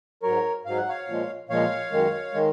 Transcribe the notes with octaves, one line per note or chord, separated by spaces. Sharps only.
G#2 F#3 A#4 C#5
G#2 F#3 F5
F#5
C#5 F5
A#2 F3 G#3
A#2 F3 G#3 C#5 F5
F#2 D#3 G#3
D#3 G#3